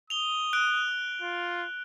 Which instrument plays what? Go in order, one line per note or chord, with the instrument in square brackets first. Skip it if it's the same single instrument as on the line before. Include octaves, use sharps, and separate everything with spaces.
[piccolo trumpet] D#6 [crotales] F7 G7
[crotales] F#6 D7
[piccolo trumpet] F4